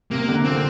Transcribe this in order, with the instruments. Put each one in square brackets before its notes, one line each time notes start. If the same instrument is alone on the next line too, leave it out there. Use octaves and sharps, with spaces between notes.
[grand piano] C3 [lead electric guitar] A#3
[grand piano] D3
[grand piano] A#2 [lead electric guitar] C4